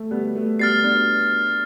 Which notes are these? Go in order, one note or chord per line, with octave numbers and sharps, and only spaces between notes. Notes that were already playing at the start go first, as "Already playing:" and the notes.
Already playing: A3
G3 B3
A3
G3 B3 F6 A6 C7
B3 D4